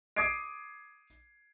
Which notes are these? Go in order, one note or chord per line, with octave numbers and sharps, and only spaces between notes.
D6 D#6 G#6 C7 D7